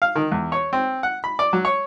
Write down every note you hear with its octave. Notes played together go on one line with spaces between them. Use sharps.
F5
D#3
E2
C#5
C4
F#5
B5
D5
F#3
C#5